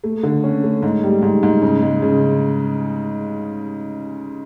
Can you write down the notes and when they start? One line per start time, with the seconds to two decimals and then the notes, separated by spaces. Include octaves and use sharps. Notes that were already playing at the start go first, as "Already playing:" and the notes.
0.04 A3
0.23 D3
0.44 C#4
0.64 A3
0.83 G#2
1.03 G3
1.22 G#2
1.43 G#2
1.62 C#3
1.82 G#3
2.02 C#3